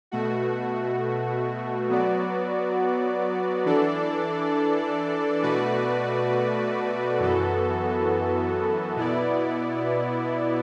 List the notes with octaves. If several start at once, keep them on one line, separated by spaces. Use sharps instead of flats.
B2 A3 F#4
F#3 B3 F#4 D5
E3 D4 A4 D5
B2 A3 F#4 B4 D5
F#2 E3 B3 F#4 A4
B2 B3 E4 D5